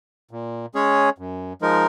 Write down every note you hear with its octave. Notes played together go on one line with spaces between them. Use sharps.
A#2
G#3 C#4 G#4 C#5
F#2
F3 G#3 D#4 A#4